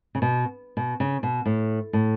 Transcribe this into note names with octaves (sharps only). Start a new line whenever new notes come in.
C#3
B2
B2
C#3
B2
A2
A2